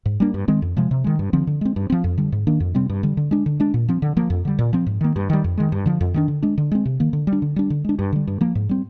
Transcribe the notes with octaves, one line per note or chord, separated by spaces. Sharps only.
G#2
G3 A#3 D4
G2
D#3 G#3 C4
F2
C3 F3 G#3
C3
D#3 G#3
G2
D3 F3 C4
D3
G#3 C4
G2
F3 C4
F2
D3 G3
G#2
D#3 A#3 D4
F2
C3 G3 C4
G2
D3 G3
D3
G#3 D4
D3
G#3 D4
A#2
F3 C4
D3
F3 A#3
F2
D3 G3
A#2
F3 C4
G#2
D#3 A#3
G2
D#3 G3
F2
D#3 G#3
G2
D3 F3
F2
D#3 G#3 D4
D3
G#3 D4
D3
G#3 C4
C3
D#3 A#3
D3
G3
D4
D3
G3 D4
D3
G#3 D4
G2
D3 G3
G2
F3 A#3
G#2
G3 C4